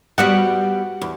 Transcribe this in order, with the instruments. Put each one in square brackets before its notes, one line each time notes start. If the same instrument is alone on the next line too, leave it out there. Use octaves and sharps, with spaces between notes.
[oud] G3 B3 F#4 [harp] F#5
[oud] E2